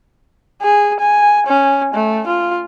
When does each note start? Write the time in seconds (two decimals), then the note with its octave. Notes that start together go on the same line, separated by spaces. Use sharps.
0.62 G#4
1.00 G#5
1.47 C#4
1.94 A3
2.27 F4